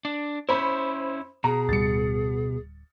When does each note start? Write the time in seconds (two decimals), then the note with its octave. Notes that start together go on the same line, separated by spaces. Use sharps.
0.05 D4
0.49 C#4 E4 C5 B5
1.44 B2 G#4 A#5
1.69 D1 G3 A6 C#7